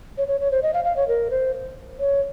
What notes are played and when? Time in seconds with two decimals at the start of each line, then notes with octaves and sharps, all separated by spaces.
0.18 C#5
0.28 C#5
0.40 C#5
0.52 C5
0.63 D#5
0.74 F5
0.85 F5
0.96 C#5
1.08 A#4
1.31 C5
2.00 C#5